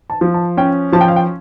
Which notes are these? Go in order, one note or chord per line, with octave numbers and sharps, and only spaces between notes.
A5
F3
A5
C#4 G5
F3 A5
G5
F5
G5